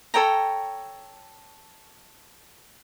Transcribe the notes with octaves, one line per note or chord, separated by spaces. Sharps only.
A4 C#5 G5 A#5